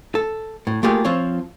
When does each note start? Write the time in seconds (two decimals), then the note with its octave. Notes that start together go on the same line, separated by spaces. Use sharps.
0.15 A4
0.67 A2
0.83 A3 A#3 F4 G4 G#4
1.05 F3 C4 F4 C#5